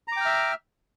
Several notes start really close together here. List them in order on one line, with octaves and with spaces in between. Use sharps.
A#5 D6 G5 F6 E5